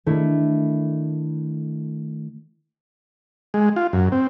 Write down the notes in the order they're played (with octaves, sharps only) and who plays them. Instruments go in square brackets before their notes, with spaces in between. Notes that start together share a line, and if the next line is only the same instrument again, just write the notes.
[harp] D#3 A3 D4 E4
[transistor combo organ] G#3
F4
F#2
C4